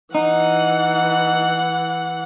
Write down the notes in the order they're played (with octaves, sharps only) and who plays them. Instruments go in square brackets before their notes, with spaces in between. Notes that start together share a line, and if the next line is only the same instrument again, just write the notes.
[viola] E3 F#5 [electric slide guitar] D#4